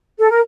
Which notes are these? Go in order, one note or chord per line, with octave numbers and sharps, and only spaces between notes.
A4
A#4